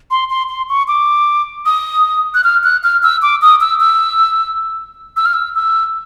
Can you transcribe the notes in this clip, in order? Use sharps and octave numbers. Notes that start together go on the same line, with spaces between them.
C6
C6
C6
C#6
D6
D#6
F#6
F6
F#6
F6
E6
D6
D#6
E6
E6
E6
F6
E6
E6